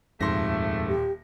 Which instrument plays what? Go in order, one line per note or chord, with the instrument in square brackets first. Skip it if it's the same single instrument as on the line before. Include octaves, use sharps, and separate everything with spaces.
[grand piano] D#1 C6 A#6 [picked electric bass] F2 G#2 [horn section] A3
[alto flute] G4